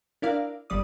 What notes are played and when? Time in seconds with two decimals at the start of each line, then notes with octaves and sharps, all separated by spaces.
0.22 D4 E4 A#4 D5 F5
0.70 G1 G3 D5 D#6